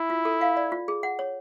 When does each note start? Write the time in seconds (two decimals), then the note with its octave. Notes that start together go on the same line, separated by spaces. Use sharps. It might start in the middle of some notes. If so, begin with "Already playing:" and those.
Already playing: E4
0.10 F4
0.25 A4
0.41 F5
0.57 D5
0.72 F4
0.88 G#4
1.03 F#5
1.19 C#5